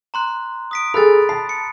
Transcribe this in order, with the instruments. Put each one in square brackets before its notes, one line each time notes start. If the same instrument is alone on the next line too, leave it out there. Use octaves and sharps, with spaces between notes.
[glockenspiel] A#5 C6 F#6
D#6 B6 D7
[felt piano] G#4 A4 [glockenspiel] B5 F#6 A6
[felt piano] A5 [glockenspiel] C7
[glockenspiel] C#7